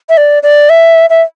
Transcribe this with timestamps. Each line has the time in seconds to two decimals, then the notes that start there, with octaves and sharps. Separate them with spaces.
0.09 E5
0.17 D5
0.43 D5
0.70 E5
1.10 E5